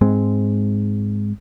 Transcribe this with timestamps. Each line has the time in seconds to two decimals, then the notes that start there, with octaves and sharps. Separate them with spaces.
0.01 G#2 G#3 C4